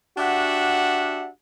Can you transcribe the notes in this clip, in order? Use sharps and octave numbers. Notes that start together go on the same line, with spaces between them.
D4 F#4 G4 E5 F#5